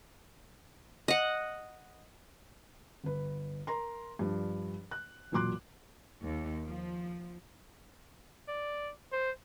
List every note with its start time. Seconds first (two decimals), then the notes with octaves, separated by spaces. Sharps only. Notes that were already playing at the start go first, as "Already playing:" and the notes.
1.08 D#5 F#5
3.04 G1 B4
3.67 A#4 A#5 C6
4.19 G2 F3 D4
4.91 F#6
5.32 E1 A#2 F#3 C6 D6 F#6
6.23 D#2
6.66 F3
8.48 D5
9.12 C5